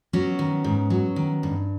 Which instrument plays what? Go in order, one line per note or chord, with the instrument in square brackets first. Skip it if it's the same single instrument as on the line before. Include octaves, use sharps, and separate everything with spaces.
[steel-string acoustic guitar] F#3 B3 C#4
D#3
G#2
F#3
D#3
G2